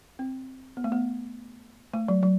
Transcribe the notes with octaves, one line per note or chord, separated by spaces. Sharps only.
C4
B3
A3
B3
A3
F#3
F#3